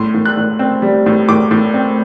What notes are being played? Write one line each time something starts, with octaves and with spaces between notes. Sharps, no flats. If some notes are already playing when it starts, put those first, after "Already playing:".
Already playing: A2 C6
A2
F#6
A2
C4
G3
A2
A2 D6
A2
C4